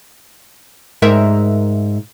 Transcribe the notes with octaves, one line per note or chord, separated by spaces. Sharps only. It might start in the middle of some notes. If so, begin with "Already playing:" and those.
G#2 A#4 E5